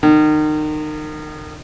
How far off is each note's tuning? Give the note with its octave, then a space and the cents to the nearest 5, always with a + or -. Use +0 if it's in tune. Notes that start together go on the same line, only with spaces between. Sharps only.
D#3 -30